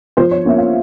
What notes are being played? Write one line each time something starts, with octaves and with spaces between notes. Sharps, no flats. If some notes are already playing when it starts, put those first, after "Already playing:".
F3 C5
C#5
A#3 C#4 E5
F5